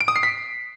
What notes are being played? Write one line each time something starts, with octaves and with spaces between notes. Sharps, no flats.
D7
D#6
C7
B6